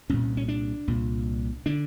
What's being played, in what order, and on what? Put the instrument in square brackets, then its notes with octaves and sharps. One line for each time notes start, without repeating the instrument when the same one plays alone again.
[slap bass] C2 A#2 C#4
C#4
D4
C2 A#2
D3 D4